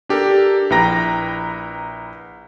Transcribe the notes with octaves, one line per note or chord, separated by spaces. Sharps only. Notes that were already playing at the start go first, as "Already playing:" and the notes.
D4 G4 A4 A#4
A#1 E4 B4 G5 A#5 A#6